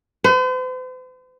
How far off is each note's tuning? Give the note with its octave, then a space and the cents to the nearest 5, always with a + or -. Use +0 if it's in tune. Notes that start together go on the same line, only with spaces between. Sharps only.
C5 -45